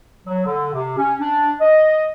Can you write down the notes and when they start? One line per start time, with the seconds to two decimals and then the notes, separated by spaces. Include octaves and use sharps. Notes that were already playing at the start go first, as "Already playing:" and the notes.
0.27 F#3
0.45 D3
0.73 C3
0.97 C#4
1.20 D4
1.60 D#5